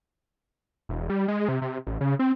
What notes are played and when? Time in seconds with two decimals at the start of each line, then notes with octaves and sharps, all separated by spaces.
0.89 E1
1.10 G3
1.28 G#3
1.48 C3
1.62 C3
1.87 A1
2.01 C#3
2.19 C4